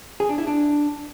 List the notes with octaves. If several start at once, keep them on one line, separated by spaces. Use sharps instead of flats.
G#4
D4
E4
D4